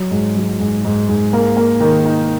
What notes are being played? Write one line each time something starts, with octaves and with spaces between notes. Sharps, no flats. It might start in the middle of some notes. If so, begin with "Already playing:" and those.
Already playing: F#3
G#2
F#3
G#2
G#2
G#2
A#3
A#3
D#3
D#4